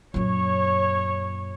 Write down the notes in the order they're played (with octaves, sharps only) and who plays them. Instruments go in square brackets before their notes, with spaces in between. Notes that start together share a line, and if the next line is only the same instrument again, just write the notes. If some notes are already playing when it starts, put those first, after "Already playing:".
[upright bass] F#2 A#2 [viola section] C#5